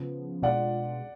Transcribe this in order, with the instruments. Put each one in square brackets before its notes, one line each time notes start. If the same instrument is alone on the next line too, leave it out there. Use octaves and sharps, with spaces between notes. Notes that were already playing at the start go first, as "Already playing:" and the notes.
Already playing: [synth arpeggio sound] C#3 F3 B3
[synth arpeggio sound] B2 G#3 D4 F4 [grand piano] D5 F#5